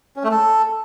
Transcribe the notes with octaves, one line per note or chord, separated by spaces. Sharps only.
C#4
A3
A4